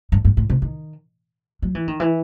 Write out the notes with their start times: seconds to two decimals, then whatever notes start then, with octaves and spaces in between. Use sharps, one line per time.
0.12 G2
0.25 G2
0.37 A2
0.50 C3
0.62 D#3
1.62 F#3
1.75 E3
1.88 D#3
2.00 E3